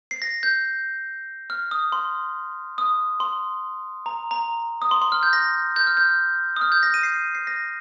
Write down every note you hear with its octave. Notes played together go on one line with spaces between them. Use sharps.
C7
A#6
G6
F6
D#6
C6
D#6
C6
A#5
A#5
D#6
C6
C6
F6
G6
A#6
G6
F6
G6
D#6
F6
G6
A#6
D#7
C7
C7
A#6